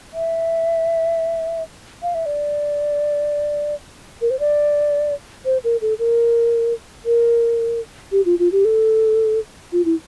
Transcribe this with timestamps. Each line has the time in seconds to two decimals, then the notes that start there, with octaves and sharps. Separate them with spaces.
0.14 E5
2.03 F5
2.15 E5
2.26 D5
4.22 A#4
4.30 C5
4.39 D5
5.45 C5
5.64 A#4
5.81 A4
5.99 A#4
7.05 A#4
8.12 G4
8.26 F4
8.39 F4
8.52 G4
8.65 A4
9.72 F4
9.85 E4